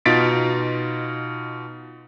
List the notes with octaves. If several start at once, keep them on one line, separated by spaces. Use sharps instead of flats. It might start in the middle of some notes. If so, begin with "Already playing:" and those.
B2 D#4 F4 A6 B6 D7